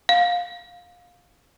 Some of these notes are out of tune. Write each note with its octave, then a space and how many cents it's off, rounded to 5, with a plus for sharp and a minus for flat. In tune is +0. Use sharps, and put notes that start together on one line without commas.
F5 +20